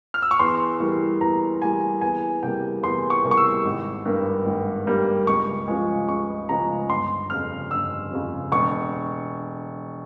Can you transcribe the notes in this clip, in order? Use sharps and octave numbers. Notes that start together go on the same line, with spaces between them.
F6
E6
C#6
E2 C6
E3 G3 A#3
E2 A#5
E3 G3 A#3 G#5
E2 G#5
C3 G3 A#3 G5
E2 C6
C#6
C3 G3 A#3
C#6
E6
G#1
G2 G3 A#3
G#1
G2 G3 A#3
C#2 C#6
C#3 F3 G#3
C#2 C#6
C#3 F3 G#3 A#5
G1 C6
F2 C#3 F6
G1 E6
F2 C#3
E1 C#6